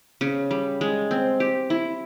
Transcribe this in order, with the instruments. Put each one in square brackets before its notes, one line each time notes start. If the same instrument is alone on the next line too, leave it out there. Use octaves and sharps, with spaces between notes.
[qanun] C#3
G3
G#3
C4
G4
E4